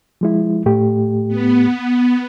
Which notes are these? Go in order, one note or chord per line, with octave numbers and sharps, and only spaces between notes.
F3 G#3 E4
A2 A3 G4
B3